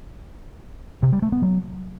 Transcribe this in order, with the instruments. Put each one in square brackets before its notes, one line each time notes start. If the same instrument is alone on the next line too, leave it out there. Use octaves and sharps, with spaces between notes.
[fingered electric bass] C3
G3
A3
B3
F#3